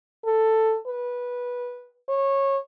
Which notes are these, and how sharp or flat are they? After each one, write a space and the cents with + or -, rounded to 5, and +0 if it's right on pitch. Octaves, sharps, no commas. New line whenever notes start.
A4 +10
B4 -15
C#5 -20